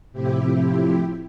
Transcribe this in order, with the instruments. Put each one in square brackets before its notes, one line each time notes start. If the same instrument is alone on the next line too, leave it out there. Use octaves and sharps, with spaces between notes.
[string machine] A2 C3 F3 C4 E4 G4